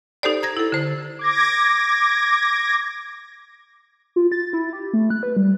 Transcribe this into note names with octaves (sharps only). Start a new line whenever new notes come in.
D#4 G4 A4 C5 D5
A#5 G#6 A#6
E4 A4
D3 C5
D6 G#6 A#6
F4
A6
E4
G4
A3
F#6
B4
G3